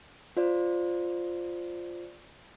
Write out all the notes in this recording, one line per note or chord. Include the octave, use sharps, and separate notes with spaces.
F4 C5 D5